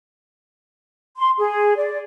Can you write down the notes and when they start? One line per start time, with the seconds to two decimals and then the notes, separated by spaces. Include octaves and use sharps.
1.18 C6
1.38 G#4
1.77 D5